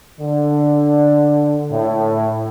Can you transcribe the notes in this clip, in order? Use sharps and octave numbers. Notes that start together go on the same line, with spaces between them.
D3
A2